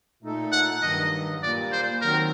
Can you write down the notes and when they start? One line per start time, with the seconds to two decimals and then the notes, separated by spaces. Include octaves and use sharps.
0.23 A#2 A3 D#4 A4
0.52 F#5
0.82 G2 D#3 F#3 D#5
1.42 A#2 G3 A#3 D5
1.72 C5
2.02 D#3 F#3 C4 A#4